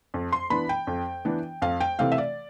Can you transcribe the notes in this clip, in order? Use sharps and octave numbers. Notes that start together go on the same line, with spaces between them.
F2
C6
E3 B3 D4 B5
G5
F2
E3 B3 D4
F2 F5
G5
C3 E3 A3 C4 F5
E5
D5